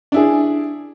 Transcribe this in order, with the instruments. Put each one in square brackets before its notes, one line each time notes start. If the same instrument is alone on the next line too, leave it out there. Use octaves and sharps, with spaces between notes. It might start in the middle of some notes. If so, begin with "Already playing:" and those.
[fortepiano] D4 E4 G#4